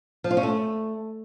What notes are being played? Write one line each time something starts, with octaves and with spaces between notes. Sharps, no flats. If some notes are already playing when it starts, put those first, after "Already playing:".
F3
F4
C#4
A3